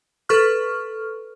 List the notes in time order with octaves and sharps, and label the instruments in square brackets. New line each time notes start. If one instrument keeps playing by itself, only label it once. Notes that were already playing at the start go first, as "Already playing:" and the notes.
[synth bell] A4 B4 C#6 F6